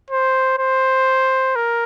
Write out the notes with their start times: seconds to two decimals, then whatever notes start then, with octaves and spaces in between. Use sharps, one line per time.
0.10 C5
0.59 C5
1.56 A#4